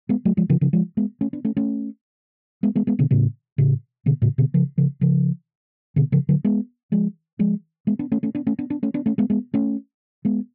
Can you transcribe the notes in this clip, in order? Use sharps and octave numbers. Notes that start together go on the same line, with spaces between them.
G#3 B3
F#3 A3
F3 G#3
C#3 F3
C#3 F3
F3 G#3
G#3 B3
A3 C#4
B3 D4
A3 C#4
A3 C#4
G#3 B3
G#3 B3
G#3 B3
B2 D3
A2 C#3
A2 C#3
B2 D3
A2 C#3
B2 D3
C#3 F3
C#3 F3
C#3 F3
B2 D3
C#3 F3
D3 F#3
G#3 B3
F3 G#3
F3 G#3
G#3 B3
B3 D4
A3 C#4
A3 C#4
B3 D4
A3 C#4
B3 D4
B3 D4
A3 C#4
B3 D4
A3 C#4
G#3 B3
G#3 B3
A3 C#4
G#3 B3